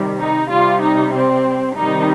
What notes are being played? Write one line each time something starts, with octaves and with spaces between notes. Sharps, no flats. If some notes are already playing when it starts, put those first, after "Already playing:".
Already playing: C3 D#3 G3
D#4
C3 G3 F4
D#4
C4
C3 D#3 G3 D#4